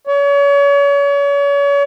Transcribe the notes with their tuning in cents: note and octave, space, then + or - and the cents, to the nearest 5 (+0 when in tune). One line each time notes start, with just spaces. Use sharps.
C#5 +35